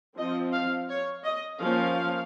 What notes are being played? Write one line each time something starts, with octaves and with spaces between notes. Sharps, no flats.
F3 C4 D#5
F5
C#5
D#5
F3 A#3 C#4 F5